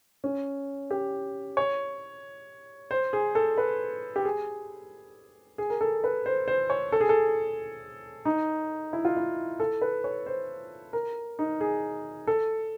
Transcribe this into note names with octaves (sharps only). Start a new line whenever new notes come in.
C#4
G4
C#5
C5
G#4
A4
B4
G4
G#4
G#4
A#4
A4
B4
C5
C5
C#5
A4
G#4
A4
D#4
E4
F4
E4
A4
B4
C#5
C5
A#4
D#4
G#4
A4